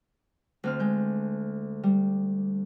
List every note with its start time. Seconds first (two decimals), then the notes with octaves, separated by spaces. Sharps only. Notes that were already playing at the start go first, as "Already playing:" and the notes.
0.64 D2 C4 F6
0.80 G#3 G6
1.83 G3